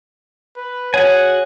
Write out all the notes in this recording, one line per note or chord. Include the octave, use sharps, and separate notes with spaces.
B4
F#4 G#4 C#5 F#5 G#5